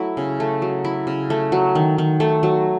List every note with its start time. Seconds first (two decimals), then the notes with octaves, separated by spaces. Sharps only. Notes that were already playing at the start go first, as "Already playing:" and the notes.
Already playing: F#3 A3 E4
0.17 C#3
0.40 A3
0.62 F#3
0.85 E4
1.07 C#3
1.30 A3
1.52 F#3
1.75 D#3
1.98 D#3
2.20 A3
2.43 F#3